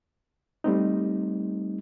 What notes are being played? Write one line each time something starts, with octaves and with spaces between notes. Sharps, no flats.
G3 A3 C4 D#4